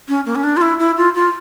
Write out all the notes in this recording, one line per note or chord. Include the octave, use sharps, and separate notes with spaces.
C#4
A#3
C#4
D4
F4
E4
E4
F4
F4